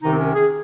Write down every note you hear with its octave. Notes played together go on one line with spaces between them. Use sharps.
C2 C3 D#3 D#4
C4
C#4
G#4